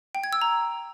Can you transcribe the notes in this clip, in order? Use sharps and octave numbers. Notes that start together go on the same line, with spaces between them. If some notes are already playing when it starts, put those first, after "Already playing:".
G5
G#6
E6
A#5